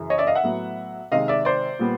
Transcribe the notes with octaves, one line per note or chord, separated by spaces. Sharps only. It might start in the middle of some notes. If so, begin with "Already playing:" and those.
Already playing: F#2 C#3 E3
C#5 D#5
D5 E5
D#5 F5
E5 F#5
A2 F#3 B3
C3 D#3 G#3 D#5 F5
D5 E5
C5 D5
A#2 G3 B3